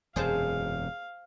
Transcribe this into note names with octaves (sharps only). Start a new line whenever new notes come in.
E1 F#2 C3 G#4 C5 F5 A5